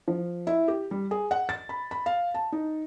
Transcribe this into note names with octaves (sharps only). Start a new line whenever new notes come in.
F3
E4
G4
G3
G#4
F#5
A6
B5
B5
F5
A5
D#4